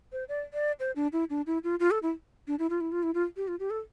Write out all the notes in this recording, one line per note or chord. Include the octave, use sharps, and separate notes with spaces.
C5
D5
D5
C5
D4
E4
D4
E4
F4
F4
A4
E4
D4
E4
F4
E4
F4
E4
F4
G4
F4
G4
A4